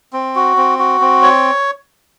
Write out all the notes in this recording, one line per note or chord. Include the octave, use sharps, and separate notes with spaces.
C4
F#4
C4
F#4
C4
C#5